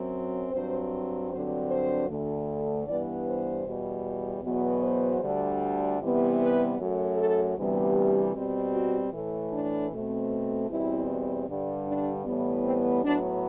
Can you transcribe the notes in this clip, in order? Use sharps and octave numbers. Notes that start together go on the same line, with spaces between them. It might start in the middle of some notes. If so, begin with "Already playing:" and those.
Already playing: F#2 F#3 C4
G2 F#3 C4 C5
G2 D3 F#3 C4 C5
C5
D2 D3 A3
G2 E3 G3 B3 D5
C5
E2 B2 G3
E2 B2 F#3 B3
C5
D2 D3 G3
C3 E3 G3 B3
B4
F#2 F#3 A3
A4
D2 C3 E3 G3 B3
G4
B2 G3 C4
F#4
A2 E3 A3
D4
B2 A3 C4
E2 B2 G3 C4 E4
G2 D3 G3
D4
A2 E3 G3 B3
C4
A2 F#3 B3 D4